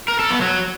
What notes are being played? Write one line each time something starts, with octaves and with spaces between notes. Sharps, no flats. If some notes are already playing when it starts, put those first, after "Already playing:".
A#4
A4
B3
F#3